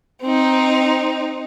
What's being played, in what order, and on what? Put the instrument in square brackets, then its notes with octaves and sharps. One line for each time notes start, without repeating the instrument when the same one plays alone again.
[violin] C4 D#4